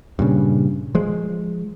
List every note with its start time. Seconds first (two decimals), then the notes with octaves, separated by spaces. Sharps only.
0.19 G2 A#2 C#3
0.95 F3 G#3